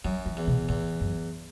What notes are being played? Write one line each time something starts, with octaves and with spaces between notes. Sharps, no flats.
F#2 F#3
E3
E2
B2
E2 A2
F#2